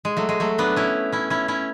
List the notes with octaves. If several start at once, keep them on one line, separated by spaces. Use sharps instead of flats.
G#3
F#3 A3
G#3
F#3 A3
B3 D4
C#4 E4
C#4 E4
C#4 E4
C#4 E4